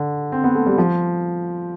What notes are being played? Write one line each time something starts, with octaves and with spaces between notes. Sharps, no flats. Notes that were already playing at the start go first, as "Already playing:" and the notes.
Already playing: D3
C4
B3
A3
G3
F3